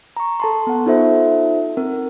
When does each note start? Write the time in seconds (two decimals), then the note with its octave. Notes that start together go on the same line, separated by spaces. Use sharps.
0.17 A#5 C#6
0.40 A4 A5 C6
0.67 B3 F#5
0.86 D#4 F4 A4 C5 E5
1.77 C4 A#4